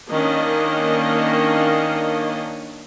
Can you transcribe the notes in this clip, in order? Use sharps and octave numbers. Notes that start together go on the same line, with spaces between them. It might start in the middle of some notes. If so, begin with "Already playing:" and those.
D#3 A#3 C#4 D4 D#5